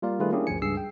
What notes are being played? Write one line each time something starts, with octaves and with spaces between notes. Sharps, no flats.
G3 A#3 F4 A#4 D5 F5
D#3 G3 A3 F4 G#4 B4
A#3 C#4 D4 E4 G4 G#4
G1 D2 F3 G#5 C#7
C#2 G2 G#4 E6 C7
G5